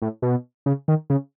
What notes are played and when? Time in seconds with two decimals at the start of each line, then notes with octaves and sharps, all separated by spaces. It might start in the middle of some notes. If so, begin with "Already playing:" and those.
0.02 A2
0.22 B2
0.66 C#3
0.88 D#3
1.10 C#3